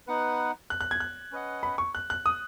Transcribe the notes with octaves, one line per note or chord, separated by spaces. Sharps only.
B3 D#4 B4 F#5
F#6
F#6
G#6
F#6
C#4 B4 D#5 F#5
B5
C#6
F#6
F#6
D#6